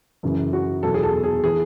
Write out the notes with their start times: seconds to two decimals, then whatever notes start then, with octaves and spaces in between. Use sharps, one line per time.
0.23 F#2 C#3 E3
0.53 F#4
0.83 E2 B2 F#3 A4
0.94 G#4
1.03 A4
1.24 G#4
1.43 E3 G#4